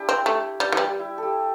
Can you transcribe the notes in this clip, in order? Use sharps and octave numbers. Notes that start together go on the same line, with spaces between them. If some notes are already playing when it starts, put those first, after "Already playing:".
Already playing: D4 E4 G4
C4
A3
G3
E3
G3 G4
E4
G4 A4